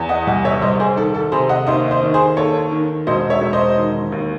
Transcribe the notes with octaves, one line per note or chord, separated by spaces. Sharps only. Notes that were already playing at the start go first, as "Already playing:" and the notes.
Already playing: E2
D#5 F#5
C2 D#5 F#5
C#5 E5
C2 C5 D#5
G#4 C5
D#3 A4
A4
C3 G#4 C5
D#5 F#5
D#2 C5 D#5
C5 D#5
D#3
G#4 C5
D#2 A4 C#5
D#3
E1 C5 D#5
C#5 E5
E1
C5 D#5
D#3
D#2